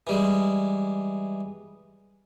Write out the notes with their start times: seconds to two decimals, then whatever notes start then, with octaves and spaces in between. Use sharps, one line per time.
0.07 E3 G3 G#3